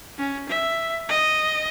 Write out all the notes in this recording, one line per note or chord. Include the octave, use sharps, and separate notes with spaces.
C#4
E5
D#5